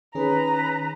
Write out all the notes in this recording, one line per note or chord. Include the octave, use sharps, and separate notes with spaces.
D#3 C#4 G#4 B4 A#5